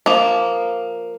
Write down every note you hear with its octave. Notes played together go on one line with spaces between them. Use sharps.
F3 A#3